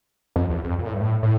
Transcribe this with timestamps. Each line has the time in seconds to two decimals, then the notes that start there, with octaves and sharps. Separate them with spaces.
0.36 F2
0.50 E2
0.64 F2
0.79 A#2
0.86 A2
0.94 G2
1.01 A2
1.23 A2